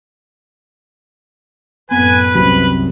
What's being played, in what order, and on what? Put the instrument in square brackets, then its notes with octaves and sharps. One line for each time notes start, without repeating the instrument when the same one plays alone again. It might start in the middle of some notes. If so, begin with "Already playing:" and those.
[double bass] F#2 A2 [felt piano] B3 [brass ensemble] B4 [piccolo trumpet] G#5
[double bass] C2 [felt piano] F#2 C3 [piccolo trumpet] B5